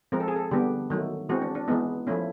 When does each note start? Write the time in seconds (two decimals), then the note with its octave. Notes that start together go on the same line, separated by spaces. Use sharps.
0.12 F3 G#3 C4 A#4
0.20 A4
0.28 G#4
0.36 A4
0.51 D3 G3 B3 G4
0.90 D#3 F#3 A3
1.29 E3 G#3 C4 F#4
1.42 D4
1.55 D4
1.68 E3 G#3 B3 D#4
2.07 F3 A3 C#4 E4